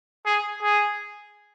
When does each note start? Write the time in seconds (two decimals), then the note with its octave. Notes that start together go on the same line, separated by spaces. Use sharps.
0.26 G#4
0.62 G#4